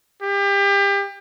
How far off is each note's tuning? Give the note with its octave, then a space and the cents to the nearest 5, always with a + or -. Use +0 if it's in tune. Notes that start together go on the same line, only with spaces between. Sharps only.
G4 +30